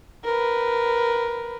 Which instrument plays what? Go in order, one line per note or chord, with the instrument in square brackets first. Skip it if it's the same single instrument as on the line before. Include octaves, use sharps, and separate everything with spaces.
[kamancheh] A#4 B4